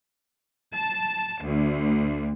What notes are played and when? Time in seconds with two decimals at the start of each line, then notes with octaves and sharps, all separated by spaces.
0.73 A5
1.42 D2